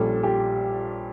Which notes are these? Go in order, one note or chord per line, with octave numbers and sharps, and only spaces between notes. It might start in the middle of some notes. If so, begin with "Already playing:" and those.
Already playing: A#1 A#2 G3 C#4 A4
G4